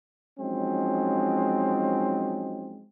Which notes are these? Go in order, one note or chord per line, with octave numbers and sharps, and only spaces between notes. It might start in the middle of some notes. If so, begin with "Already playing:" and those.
F3 F#3 G#3 C4 C#4 D#4